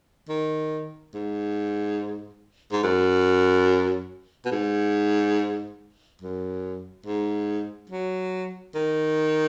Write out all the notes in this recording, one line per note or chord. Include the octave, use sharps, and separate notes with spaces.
D#3
G#2
G#2
F#2
B2
G#2
F#2
G#2
F#3
D#3